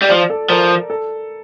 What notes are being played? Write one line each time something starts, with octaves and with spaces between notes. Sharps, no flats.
G3
F3 D5
A4
F3 A#4
A4